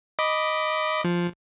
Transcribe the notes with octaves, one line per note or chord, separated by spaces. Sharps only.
D#5 B5 D6
F3